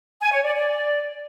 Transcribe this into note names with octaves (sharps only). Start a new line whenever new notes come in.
G#5
C#5
D5
D5